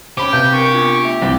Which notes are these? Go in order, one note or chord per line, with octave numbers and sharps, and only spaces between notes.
C#4 G4 C5 B5 D6
C3 B4 F5 G6
C4 D4 A#4 C#6
B3 D4 F4
A3 E5
C2 C4 G5